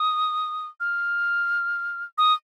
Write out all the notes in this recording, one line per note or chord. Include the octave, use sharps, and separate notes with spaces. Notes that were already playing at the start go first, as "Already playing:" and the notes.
Already playing: D#6
F6
D#6